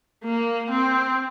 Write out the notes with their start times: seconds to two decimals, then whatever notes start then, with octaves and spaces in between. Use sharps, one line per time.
0.24 A#3
0.70 C4